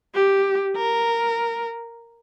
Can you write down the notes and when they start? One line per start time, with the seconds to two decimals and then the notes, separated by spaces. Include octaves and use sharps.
0.15 G4
0.76 A#4